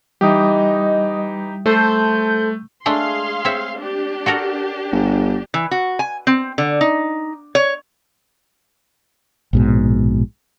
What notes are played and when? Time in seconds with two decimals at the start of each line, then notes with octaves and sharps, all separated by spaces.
0.21 E3 G3 D#4 G4 D#5 G5 D#6
1.66 A3 A4 C5 G6
2.86 G#3 A3 D4 G#4 F5 C6
3.45 C4 C#5 E5
3.78 D4 G4
4.26 F#4 A4 A#4
4.92 G1
5.54 E3
5.71 F#4
5.99 G#5
6.27 C4
6.58 D3
6.81 D#4
7.55 C#5
9.53 A#1 G#2 B2